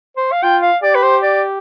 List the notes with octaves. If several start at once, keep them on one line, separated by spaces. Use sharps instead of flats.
C5
F5
F4 G5
F5
G4 D5
B4
C5
D5